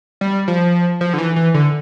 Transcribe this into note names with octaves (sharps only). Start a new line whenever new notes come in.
G3
F3
F3
D3
E3
E3
D3